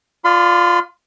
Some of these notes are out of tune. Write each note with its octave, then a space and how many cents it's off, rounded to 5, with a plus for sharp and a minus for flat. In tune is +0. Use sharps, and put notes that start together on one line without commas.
F4 +10 D5 +10 C6 -45